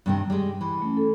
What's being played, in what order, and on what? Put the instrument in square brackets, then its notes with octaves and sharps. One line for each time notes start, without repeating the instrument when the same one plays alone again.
[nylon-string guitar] G2 C3 D#3
G3 G#3
[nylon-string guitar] E3 [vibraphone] B5
[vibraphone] A3 C#4
A4